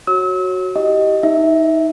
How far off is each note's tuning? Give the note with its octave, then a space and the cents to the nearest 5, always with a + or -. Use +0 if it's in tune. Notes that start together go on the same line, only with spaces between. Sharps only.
F#4 +0 C#5 -20 E6 -40
E4 -5 G4 -5 D#5 +0
D#4 +25 E5 -10